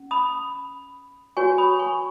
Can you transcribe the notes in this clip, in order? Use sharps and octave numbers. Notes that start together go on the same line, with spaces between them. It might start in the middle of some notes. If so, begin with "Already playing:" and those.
Already playing: C#4
B5 D#6
F#4 C#5 G#5 C#6
B5 D#6
G#5 C#6